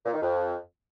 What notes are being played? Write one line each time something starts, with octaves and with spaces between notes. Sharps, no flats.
A#2
D#3
F2